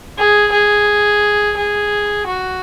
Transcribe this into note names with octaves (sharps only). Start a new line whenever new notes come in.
G#4
G#4
G#4
F#4